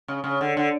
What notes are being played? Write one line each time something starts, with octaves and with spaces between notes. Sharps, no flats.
C#3
C#3
D3
D3